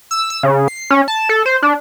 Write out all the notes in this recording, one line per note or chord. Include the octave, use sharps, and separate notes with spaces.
E6
E6
C#3
C7
C#4
A5
A4
C5
D4